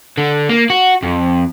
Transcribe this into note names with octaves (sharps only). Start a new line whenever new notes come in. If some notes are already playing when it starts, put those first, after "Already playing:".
D3
A#3
F#4
F2